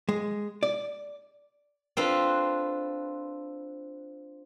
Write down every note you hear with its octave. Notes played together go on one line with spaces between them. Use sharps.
G#3
D5
C4 D4 F4 A4 B4